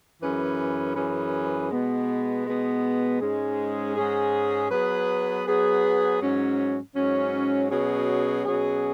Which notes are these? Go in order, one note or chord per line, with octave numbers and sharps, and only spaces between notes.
F#2 E3 C#4 G#4 B4
F#2 E3 C#4 G#4 B4
B2 G#3 B3
B2 G#3 B3
G#2 G#3 C#4 G#4
G#2 G#3 C#4 G#4
F#3 B3 G#4 B4
F#3 B3 G#4 B4
G#2 F#3 C#4
G#2 F#3 C#4
B2 F#3 C#4 G#4
B2 F#3 C#4 G#4